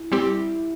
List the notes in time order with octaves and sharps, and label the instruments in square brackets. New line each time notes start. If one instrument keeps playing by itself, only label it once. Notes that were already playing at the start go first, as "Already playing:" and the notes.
Already playing: [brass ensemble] E4
[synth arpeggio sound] G3 C4 G4